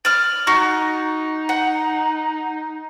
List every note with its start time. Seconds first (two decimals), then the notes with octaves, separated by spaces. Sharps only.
0.05 D5 F6
0.47 D#4 F#4
1.49 F#5